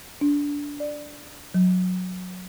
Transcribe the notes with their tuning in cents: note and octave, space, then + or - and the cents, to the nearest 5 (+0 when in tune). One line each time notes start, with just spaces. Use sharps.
D4 -20
D5 +10
F#3 -15